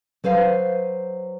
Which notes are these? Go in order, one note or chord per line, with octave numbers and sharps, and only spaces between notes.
F#3 B4 C5 F5